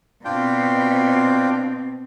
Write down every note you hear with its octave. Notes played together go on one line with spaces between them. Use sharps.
B2 C4 D4 F4 G5